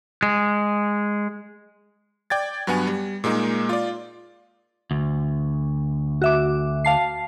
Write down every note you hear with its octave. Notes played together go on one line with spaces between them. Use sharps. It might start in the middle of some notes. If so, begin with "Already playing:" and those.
G#3
D5 G5 G#6 A6
G2 F#3 B3 F#5 G#5
G3
A#2 G#3 A#3 D#4
F4 D5
D2
F#4 E5 D6
F5 A5 C7